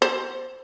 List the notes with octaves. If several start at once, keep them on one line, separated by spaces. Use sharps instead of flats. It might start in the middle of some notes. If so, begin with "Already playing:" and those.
C5